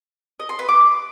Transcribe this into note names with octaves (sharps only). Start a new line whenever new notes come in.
D#5
C6
B4
D6